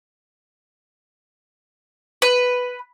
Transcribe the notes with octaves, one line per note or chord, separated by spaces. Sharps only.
B4